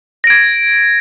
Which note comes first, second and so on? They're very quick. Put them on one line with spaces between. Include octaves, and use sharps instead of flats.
A#6 D7 G#6